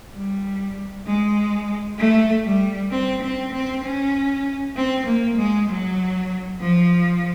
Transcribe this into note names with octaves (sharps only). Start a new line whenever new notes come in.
G3
G#3
A3
G3
C4
C4
C4
C#4
C4
A#3
G#3
F#3
F3